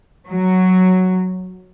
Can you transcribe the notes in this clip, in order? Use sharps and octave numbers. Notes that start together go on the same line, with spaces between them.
F#3